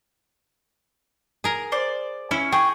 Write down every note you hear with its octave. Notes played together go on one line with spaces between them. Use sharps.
G#4 A#4
C5 D5
C#4 E4
G#4 G5 C#6